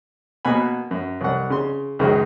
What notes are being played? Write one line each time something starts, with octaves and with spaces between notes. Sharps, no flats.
B2 A#3 F#5 G#5 B5
F#2
C2 F#5
C#3 C6
C#2 F#2 D#3 G#3